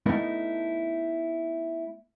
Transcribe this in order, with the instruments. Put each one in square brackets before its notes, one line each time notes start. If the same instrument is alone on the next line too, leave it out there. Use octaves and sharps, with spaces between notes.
[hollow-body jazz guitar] A3 B3 D#4 E4 A#4